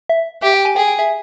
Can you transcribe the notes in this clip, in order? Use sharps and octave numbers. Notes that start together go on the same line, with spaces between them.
E5
G4 E5
G5
G#5
G#4 G5
G5
E5